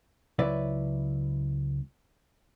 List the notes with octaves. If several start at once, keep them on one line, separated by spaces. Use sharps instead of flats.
C#2 F#3 E4 B4 D5 E5